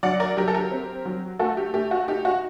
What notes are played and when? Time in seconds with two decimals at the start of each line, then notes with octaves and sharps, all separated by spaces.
0.03 F#3 D5 F#5
0.20 A#4 D5
0.37 F#3 G4 A#4
0.48 A4
0.54 G4 A#4
0.71 C4
1.05 F#3
1.39 A3 F#4 A4
1.57 G4
1.74 A3 G4
1.91 F#4
2.08 D#4 G4
2.25 F#4